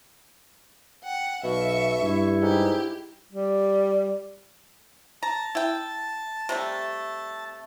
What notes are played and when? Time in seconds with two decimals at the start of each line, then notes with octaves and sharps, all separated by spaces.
1.04 F#5 G5
1.44 B1 B2 E5 F5 C#6
2.02 G2 E4
2.42 G#2 G4
3.32 G3
5.23 A5 A#5
5.55 E4 G5
6.49 C3 G3 A3